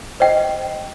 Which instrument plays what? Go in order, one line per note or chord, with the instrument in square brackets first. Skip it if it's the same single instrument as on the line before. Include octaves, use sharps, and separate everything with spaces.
[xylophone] C5 D#5 G5